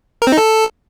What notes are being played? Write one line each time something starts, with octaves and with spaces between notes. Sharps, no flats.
A#4
C4
D#4
A4